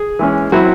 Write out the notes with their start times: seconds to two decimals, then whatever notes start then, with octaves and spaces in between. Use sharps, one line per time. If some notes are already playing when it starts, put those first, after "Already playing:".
Already playing: G#4
0.19 E3 G#3 C#4
0.52 F#3 C4 E4 F#4